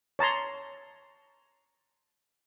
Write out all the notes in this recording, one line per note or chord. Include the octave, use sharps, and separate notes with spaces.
C#5 A5 A#5 C6